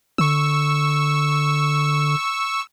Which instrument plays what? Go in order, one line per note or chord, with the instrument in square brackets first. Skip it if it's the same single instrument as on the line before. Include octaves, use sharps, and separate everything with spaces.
[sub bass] D3 [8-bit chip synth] C#6 E6